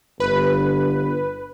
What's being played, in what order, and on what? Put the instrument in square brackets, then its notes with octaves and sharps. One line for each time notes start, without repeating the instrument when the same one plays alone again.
[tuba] G1 [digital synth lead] B4